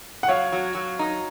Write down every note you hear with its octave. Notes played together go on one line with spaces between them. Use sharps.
F#5
F#3 C#5 F5
F#3
F#3
D#4